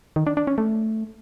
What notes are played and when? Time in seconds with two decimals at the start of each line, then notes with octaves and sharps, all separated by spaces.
0.16 D#3
0.27 D4
0.37 D4
0.47 C#4
0.58 A3